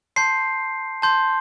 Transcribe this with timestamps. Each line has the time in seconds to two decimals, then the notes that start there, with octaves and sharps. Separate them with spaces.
0.16 A5 C6 G6 C7
1.02 A5 C6 G6